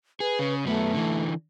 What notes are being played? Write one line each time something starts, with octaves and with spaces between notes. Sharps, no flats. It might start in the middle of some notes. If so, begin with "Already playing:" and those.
G#4 B4
C#3
F#2 A3 B3
D3 E3